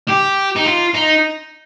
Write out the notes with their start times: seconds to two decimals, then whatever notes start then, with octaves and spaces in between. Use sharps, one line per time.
0.08 G4
0.56 D#4
0.66 F4
0.94 D#4